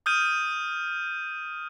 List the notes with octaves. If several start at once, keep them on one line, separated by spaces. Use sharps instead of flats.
D#6 F6 G6 D#7